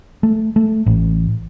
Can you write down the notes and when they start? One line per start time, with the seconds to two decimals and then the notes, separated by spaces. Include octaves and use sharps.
0.23 A3
0.56 A3
0.86 A1